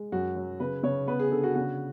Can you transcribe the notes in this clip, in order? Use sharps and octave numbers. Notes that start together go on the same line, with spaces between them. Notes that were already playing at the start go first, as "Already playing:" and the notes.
Already playing: G#3
F#2 F#4
F#3
C#3 B4
C#3 C#5
B3 B4
G#4
D3 A4
F#4
C#3 F#4